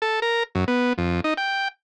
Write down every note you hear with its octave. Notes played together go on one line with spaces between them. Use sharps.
A4
A#4
F#2
B3
F2
D#4
G5